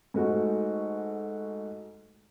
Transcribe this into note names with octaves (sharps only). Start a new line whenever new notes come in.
G#2 A3 F#4